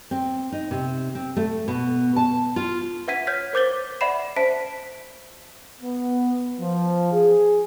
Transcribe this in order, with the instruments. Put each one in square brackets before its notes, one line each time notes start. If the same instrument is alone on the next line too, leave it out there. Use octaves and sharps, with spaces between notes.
[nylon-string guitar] C4
D#4
C3
C4
A3
B2
A5
F4
[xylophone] B4 E5 F#5 G#6 B6 D#7
C#5 F6 G6 G#6 B6
A#4 C5 D6 G6 A6 G7
D5 E5 F#5 B5 C7 E7
C5 E5 A5 B6 D7
[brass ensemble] B3
F3
G#4